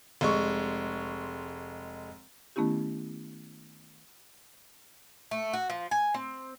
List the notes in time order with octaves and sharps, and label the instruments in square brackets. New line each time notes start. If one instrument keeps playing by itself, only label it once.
[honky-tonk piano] F1 G#3 C#6
[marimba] D#3 A3 B3 C#4 E4 G4
[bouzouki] A3
F#4
F3
G#5
C4